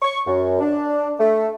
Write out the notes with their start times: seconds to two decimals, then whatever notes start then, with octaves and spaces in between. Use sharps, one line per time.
0.02 C#6
0.27 F#2
0.60 D4
1.20 A3